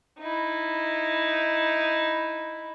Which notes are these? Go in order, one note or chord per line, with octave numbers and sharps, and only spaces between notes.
D#4 E4